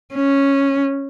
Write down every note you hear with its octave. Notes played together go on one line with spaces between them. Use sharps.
C#4